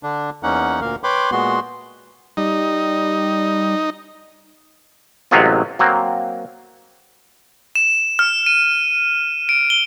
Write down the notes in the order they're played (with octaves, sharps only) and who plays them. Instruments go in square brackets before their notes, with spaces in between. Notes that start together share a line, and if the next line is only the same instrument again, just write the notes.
[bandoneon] D3 D4
E2 A#3 C#4 D#4 F#5
D2 A#2 A#3 A#4 F5
B4 C#5 G5 B5 C6 D6
A#2 G#3 B3 F#4 C6
[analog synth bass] G3 [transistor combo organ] D#4
[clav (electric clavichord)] A1 C3 F#3 G#3 C#4 F4
F#3 A#3 C4
[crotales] E7
F6
D#7
D7
G7